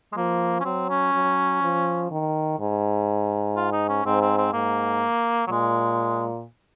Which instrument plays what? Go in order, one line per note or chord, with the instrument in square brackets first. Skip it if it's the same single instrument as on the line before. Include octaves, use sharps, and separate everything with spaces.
[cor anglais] G#3
[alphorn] F3 [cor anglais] A#3
[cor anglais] C#4
[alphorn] F#3 [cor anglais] C4
[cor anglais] C#4
[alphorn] F#3
F3
D#3
G#2
[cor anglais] F4
D#4
C#4
[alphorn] G#2 [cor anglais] C4
[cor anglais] C4
C4
[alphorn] G#2 [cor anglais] A#3
[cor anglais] F#3
[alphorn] A#2 [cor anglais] G#3